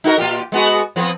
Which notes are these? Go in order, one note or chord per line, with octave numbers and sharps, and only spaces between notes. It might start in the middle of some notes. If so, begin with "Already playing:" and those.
D#4 F#4 A#4
A#2 F4 G4
G#3 B3 F#4
F3 B3 C4